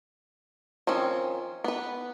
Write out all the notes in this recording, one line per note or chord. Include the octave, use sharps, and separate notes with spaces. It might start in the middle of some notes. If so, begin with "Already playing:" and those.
D#3 F3 C4 C#4
B3 B4